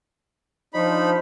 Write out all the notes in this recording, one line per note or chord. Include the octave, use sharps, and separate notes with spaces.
F3 D4 D#4 C5 B5